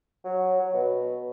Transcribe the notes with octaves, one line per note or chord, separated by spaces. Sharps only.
F#3
F#3
B2